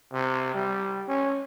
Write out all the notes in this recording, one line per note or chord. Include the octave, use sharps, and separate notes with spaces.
C3
G3
C#4